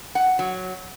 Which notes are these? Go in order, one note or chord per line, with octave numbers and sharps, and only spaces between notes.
F#5
F#3